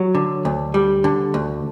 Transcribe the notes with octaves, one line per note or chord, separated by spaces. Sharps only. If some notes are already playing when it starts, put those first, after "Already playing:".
Already playing: F#3
D3
D2
G3
D3
D2